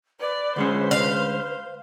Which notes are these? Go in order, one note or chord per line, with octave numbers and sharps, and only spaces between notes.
B4 D5
D2 G#3 C#4 C5
F5